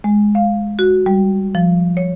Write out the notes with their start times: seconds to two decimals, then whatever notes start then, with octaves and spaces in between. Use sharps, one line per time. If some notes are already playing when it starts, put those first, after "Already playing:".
0.04 G#3
0.35 F5
0.79 F#4
1.06 G3
1.55 F3
1.97 C#5